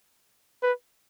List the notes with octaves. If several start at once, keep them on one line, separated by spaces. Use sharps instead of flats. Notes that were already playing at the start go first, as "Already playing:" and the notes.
B4